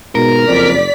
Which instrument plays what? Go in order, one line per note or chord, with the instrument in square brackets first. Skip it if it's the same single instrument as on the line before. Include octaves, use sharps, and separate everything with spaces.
[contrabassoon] G#2 [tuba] B2 [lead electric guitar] A#4
[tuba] F#1 [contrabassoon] F2 [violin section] D5 B6